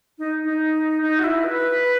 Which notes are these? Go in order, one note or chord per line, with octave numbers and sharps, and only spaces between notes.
D#4
D#4
D#4
F#4
E4
B4